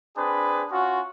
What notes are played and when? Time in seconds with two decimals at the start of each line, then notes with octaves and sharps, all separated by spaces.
0.17 C4 D4 G#4 B4
0.71 C#4 F4 F#4